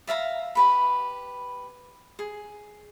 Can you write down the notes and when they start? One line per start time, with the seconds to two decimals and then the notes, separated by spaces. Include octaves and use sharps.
0.07 D5 E5 F5 A#5
0.55 G4 B4 B5
2.19 G#4